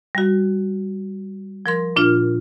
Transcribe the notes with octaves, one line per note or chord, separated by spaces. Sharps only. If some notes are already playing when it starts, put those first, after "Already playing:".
G3 F#4
F3 A#4 C6
A#2 D4 F4 F6